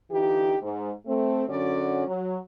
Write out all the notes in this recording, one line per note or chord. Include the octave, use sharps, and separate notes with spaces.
D3 E3 D#4 F4 G4
G#2
A3 C4
F#2 D3 F#3 C#4 F#4 D5
F#3